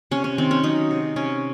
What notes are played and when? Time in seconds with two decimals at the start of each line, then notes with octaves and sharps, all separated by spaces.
0.11 C3 C#4
0.24 C#4
0.38 D#3 C4
0.51 C#4
0.63 F#3 D#4
0.91 C3
1.16 C3 C#4